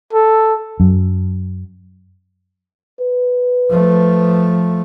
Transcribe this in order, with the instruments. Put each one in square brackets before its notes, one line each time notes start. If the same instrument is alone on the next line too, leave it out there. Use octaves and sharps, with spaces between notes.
[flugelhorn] A4
[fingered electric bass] F#2
[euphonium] B4
[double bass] F3 A3